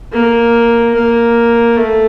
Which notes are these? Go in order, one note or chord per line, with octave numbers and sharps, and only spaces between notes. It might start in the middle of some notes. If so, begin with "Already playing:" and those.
A#3
A#3
A3